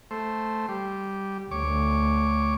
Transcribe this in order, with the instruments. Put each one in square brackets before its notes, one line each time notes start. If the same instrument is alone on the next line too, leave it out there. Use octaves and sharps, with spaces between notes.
[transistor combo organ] A3 C5
G3
[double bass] D2 [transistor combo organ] C#5 D6